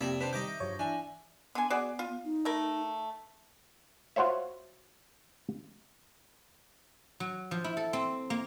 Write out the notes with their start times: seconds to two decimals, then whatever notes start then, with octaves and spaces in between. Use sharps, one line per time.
0.01 F2 C3 A#3 G4 D5 E5
0.21 D#3 D4 B4 C5 B6
0.33 D#3 G3 D#4 D#5 D6 G6 A#6
0.48 E5
0.60 G2 F3 F#3 C#5
0.79 E3 D4 E5 G#5
1.55 D3 B3 G#5
1.70 F#4 G#4 D5
1.99 F4
2.25 D#4
2.45 A3 A#4
4.16 F4 F#4 C5 C#5 E5
7.20 F#3
7.51 F3
7.64 E4
7.77 A4
7.93 C4
8.30 A#3